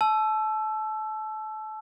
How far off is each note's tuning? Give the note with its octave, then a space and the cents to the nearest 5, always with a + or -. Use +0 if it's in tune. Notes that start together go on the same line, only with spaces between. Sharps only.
A5 -30 E6 +15